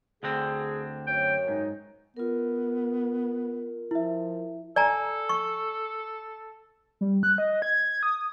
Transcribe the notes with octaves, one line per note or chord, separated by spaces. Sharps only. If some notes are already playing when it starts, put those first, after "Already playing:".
D2 D3 C4 G#4
F#2 C#5 G5
G#2 D#4
B3 F4 A#4
F3 E4 E5
A4 D5 G#5 A#5
C#6
G3
F#6
D#5
G#6
D#6